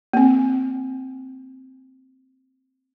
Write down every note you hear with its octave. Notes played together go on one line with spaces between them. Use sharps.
A#3 C4